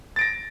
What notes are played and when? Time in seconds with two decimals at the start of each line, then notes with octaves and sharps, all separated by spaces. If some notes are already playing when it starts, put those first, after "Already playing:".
0.16 A6
0.19 D7
0.21 A#6